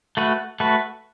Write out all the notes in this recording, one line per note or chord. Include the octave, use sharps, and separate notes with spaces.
A3 F#4 B4
A3 F#4 B4